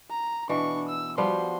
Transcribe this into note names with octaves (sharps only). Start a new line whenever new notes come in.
A#5
B2 E3 D4 C#6
E6
F3 G3 B3 F#4 C6